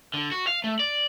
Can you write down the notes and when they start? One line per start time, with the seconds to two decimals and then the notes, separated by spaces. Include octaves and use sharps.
0.14 D3
0.32 F#4
0.47 F5
0.64 A3
0.79 D5